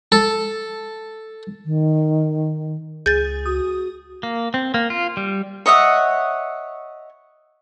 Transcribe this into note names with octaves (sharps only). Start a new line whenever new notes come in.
A4
D#3
C#2 G#4 G6 A6
F#4 D#6
A#3
C4
A#3
F4
G3
C#5 D#5 E5 F#5